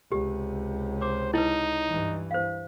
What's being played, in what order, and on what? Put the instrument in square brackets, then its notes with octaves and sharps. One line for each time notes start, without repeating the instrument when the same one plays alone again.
[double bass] C#2 C3 [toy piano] G4
[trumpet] C5 [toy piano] D6
[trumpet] D#4 [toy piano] E4 B4
[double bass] G2 E3
[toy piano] C5 F5